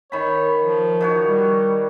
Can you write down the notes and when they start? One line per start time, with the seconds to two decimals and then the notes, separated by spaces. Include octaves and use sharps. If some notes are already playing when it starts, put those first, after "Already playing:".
0.12 D#3 C#5 B5
0.62 F3
1.01 D#3 F#4 C#5
1.26 G3